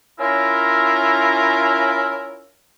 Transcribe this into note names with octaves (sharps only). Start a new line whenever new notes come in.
C#4 E4 F4 A#4